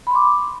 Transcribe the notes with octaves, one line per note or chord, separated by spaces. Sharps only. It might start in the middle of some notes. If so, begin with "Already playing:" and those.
B5 C6 D6